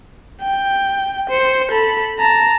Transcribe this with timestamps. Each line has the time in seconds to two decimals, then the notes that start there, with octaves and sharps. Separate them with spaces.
0.42 G5
1.30 C5 C#7
1.71 A4 B5
2.19 A5 A#5